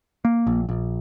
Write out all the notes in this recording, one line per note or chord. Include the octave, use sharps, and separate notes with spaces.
A#3
A#1
A#1